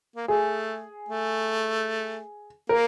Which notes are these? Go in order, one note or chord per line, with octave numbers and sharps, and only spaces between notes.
A#3
A3 G#4
A3
A#3 A#4